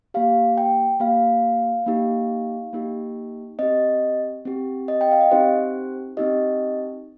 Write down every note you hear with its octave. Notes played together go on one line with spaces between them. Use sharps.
A#3 G4 F5
G5
A#3 G4 F5
A#3 D#4 G4
A#3 D#4 G4
C4 G4 D#5
C4 G4
D#5
G5
F5
D#5
C4 D#4 G4 C5
C4 D#4 G4 D#5